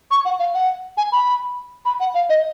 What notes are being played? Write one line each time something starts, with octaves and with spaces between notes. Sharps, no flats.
C#6
F#5
F5
F#5
G#5
B5
B5
F#5
F5
D#5